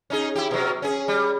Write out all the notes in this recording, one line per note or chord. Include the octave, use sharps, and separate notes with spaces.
C#4 D#4 G#4
E4 G4
B2 F#3
C#4 G#4
G3